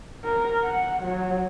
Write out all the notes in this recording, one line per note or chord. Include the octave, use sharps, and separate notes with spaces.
A#4
F#5
F#3